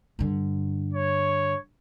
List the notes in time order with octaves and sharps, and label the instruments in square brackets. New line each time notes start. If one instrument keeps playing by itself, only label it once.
[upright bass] G2 D3
[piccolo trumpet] C#5